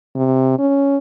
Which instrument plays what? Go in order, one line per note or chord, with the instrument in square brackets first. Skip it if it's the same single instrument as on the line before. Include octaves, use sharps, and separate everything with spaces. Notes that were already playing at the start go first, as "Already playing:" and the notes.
[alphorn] C3
C#4